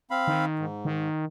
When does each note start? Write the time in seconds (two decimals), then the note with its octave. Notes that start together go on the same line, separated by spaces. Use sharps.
0.11 C4 F5 B5
0.28 D#3
0.59 G#2
0.85 D#3